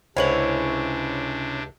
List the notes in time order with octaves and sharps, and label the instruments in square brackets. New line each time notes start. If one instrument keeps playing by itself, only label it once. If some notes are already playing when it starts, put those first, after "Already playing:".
[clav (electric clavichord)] C#2 [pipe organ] C3 D4 [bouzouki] C#4 E4 [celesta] C5 F#7